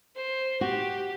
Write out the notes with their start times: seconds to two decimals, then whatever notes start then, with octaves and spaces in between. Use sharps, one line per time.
0.15 C5
0.61 F#4 G4